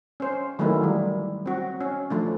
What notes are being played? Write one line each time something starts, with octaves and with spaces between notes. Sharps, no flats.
C#4 C5
D#3 E3 F#3 A3 A#3 E4
G3
C4 F#4
C#4
F3 A3 D4